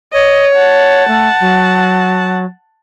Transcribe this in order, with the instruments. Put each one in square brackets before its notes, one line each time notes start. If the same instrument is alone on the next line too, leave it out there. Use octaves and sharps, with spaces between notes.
[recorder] C#5 [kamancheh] D#5
[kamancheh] F#5 A5
[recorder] A3
F#3